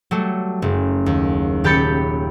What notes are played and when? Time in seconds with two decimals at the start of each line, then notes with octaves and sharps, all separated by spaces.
0.11 F#3 G3 A3
0.62 F#1
1.06 D#2
1.64 D#1 G4 B5 G6 A6 C#7